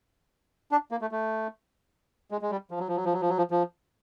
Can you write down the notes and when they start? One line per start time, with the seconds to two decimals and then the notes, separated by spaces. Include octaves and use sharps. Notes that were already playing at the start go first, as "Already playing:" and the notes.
0.72 D4
0.91 A#3
1.01 A3
1.11 A3
2.31 G#3
2.42 G#3
2.51 G3
2.71 F3
2.79 F#3
2.88 F3
2.96 F#3
3.05 F3
3.13 F#3
3.21 F3
3.29 F#3
3.38 F3
3.51 F3